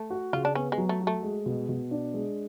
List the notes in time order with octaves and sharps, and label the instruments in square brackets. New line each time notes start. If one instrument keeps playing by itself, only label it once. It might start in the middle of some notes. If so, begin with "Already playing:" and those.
Already playing: [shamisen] A3
[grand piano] F#4
[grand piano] C#3 [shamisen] F4
[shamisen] D4
[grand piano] B3 [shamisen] C#4
[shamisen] G#3
[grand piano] F#3
[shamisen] A3
[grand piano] F#4
[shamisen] A3
[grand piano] G#3
B2
B2
D4
G#3